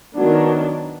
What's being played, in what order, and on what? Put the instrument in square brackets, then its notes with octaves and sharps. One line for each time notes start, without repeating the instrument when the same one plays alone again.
[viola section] D#3 F#3 B3 D4